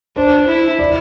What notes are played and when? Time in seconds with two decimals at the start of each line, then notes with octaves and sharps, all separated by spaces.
0.16 D4 C5
0.48 E4
0.79 D5